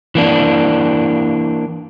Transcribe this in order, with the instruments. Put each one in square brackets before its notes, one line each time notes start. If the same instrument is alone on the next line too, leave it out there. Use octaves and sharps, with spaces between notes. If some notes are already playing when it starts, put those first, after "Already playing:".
[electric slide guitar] E3 A#3 D4